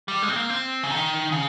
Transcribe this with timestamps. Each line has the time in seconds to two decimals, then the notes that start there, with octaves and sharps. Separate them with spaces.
0.08 G3
0.22 G#3
0.29 C4
0.36 A#3
0.50 C4
0.83 C#3
0.91 D#3
1.32 C#3